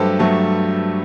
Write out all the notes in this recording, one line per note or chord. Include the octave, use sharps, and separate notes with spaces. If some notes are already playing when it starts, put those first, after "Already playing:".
Already playing: G2 F#3 A3 G4 A4 B4 C5
G2 F#3 A3